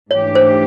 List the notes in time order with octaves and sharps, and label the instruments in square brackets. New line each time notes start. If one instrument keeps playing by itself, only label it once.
[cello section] G#2 E3 A3 D4 G4 [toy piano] C#5
[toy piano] C5